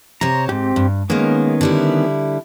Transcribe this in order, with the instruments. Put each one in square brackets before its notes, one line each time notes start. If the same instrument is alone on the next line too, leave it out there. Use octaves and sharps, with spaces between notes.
[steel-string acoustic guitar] C3 C5 C#5 [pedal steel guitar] A#5
[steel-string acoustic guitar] G#2 [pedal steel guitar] C4 G4
[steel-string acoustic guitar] G2
[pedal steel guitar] D#3 B3 C#4 [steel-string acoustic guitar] G#3 A#3
[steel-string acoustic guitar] D3 G3 E4